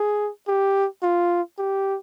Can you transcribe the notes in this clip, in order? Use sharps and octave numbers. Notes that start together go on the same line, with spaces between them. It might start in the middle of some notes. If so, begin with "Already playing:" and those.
Already playing: G#4
G4
F4
G4